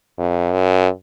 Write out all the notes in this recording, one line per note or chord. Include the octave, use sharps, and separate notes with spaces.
F2
F#2